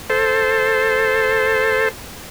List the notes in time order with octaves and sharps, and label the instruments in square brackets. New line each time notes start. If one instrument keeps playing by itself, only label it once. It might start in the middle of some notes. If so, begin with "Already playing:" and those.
[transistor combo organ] A4 C5